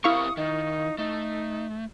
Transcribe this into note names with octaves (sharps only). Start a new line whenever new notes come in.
C4 E4 G4 A#4 F5 C#6 D#6
D#3 D#4
A3 D#4